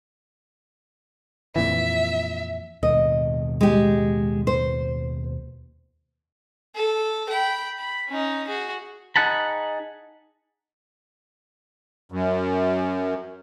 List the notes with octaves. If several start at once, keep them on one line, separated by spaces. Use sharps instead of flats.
F2 A#2 E3 E5
D#2 B2 D#5
G#3 G4
C5
A4
G5 B5
B5
C#4 D#4
F#4 G#4
D#4 G#4 F#5 A5 B5
F#2